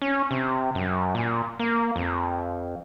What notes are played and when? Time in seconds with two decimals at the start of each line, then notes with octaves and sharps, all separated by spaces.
0.02 C#4
0.31 C3
0.75 F#2
1.15 A#2
1.59 A#3
1.96 F2